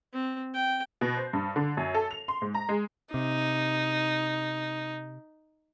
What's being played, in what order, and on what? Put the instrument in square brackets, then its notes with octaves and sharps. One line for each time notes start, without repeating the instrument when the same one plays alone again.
[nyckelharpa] C4
G5
[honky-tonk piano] B2
C5
G2
D3
F#2
A4
F7
C6
G#2
A#5
G#3
[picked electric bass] C3 [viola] D#4